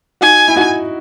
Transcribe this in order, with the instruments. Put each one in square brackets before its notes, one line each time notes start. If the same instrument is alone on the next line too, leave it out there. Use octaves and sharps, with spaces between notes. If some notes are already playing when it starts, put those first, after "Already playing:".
[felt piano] D#4 F#4 [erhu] G#5
[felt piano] E4
D#4 F#4